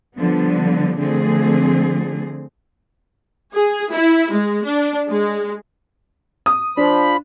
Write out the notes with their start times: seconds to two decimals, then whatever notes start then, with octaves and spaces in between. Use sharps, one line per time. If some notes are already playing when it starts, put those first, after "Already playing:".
0.15 D3 F3 G3 B3
0.99 D3 F3 A3 C4 G#4
3.54 G#4
3.92 E4
4.32 G#3
4.64 D4
5.08 G#3
6.46 D#6
6.77 F3 D4 B5